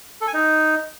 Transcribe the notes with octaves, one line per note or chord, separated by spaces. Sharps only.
A4
G#5
D#4